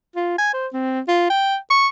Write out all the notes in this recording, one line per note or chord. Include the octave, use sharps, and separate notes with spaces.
F4
G#5
C5
C4
F4
G5
C#6